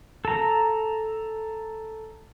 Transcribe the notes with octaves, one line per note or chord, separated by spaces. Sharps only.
A4 A#5